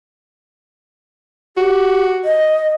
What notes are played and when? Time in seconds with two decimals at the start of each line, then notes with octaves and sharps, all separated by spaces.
1.57 F#4 G4
2.25 D#5